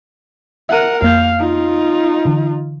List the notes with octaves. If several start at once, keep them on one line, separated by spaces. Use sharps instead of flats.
A#4 E5 F#5 F#6 D#7
F2 A#3 F5 G6
D#4 F4
D3 E3